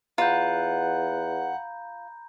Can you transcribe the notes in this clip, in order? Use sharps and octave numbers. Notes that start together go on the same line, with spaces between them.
E2 F4 F#5 A#5 B5 G6